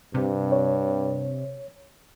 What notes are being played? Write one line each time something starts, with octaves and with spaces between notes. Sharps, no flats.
G2 C3
C#5